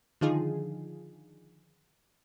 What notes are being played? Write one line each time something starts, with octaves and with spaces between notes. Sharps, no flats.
D3 D#3 F3 D#4 F4 G#4